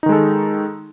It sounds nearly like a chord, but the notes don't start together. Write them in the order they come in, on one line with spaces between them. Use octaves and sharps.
D#4 D#3 G#3 A4